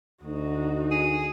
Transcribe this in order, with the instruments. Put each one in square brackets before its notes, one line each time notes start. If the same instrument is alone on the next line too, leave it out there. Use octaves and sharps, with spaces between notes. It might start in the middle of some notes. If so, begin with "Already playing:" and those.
[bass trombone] D2 [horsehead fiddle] D#4 F#4
[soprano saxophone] G#4